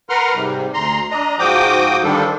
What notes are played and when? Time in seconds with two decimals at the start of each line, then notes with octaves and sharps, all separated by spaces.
0.10 A#4 B4 F#5 A#5 C6 F6
0.35 G#2 C3 G3
0.74 D2 A#5 C6
1.11 D4 D#5 A#5
1.39 G#2 F3 F#4 G5 D6 D#6
2.03 D3 D#3 F3 G3 D4 A4